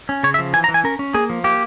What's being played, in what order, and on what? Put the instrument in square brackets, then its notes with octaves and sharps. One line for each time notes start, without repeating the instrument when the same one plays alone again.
[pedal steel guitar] C#4
C#3 C#5
E5
F3
E3 G#5
A#5
E3
G#5
C#4 A#4
C#4
A#3 G#4
F3
A#3 G4